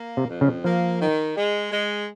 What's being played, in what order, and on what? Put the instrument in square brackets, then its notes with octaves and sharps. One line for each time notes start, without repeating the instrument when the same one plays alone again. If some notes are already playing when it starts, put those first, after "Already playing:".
Already playing: [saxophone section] A#3
[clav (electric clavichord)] C3
[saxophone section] F2
[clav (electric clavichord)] C#3
[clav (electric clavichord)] F3 [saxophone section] A#3
[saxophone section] D#3
G#3
G#3